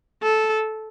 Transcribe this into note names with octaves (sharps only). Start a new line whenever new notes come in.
A4